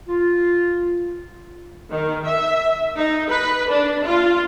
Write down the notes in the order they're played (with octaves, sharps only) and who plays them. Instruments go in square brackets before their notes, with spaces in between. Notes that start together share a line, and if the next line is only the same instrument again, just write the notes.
[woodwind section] F4
[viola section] D#3
E5
D#4
B4
D4
F4